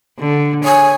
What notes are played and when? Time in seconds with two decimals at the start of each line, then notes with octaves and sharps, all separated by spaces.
0.20 D3
0.64 C#5 G#5